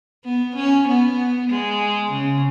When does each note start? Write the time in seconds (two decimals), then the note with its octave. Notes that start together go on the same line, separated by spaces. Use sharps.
0.25 B3
0.56 C#4
0.88 B3
1.50 G#3
2.12 C#3